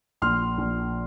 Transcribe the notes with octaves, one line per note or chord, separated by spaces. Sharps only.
A#1 C6 F6
A#1